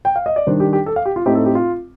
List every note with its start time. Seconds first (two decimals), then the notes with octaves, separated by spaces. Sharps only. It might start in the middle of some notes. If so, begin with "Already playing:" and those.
0.05 G5
0.16 F5
0.26 D#5
0.36 D5
0.47 D#3 G3 D4 C5
0.60 G4
0.73 G4
0.86 A4
0.96 F5
1.05 G4
1.16 F4
1.26 A2 A3 C4 D#4 G4
1.35 A4
1.46 G4
1.55 F4